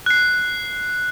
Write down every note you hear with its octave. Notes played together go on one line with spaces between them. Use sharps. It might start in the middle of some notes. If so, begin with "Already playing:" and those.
F#6 C7